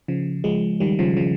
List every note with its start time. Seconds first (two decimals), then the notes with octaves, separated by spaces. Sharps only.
0.08 C#3 F3
0.44 F3 G#3
0.80 D#3 G3
0.99 C#3 F3
1.17 C#3 F3